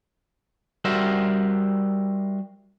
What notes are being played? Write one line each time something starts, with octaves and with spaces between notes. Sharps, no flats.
G3 F#4 A#4 C5 E5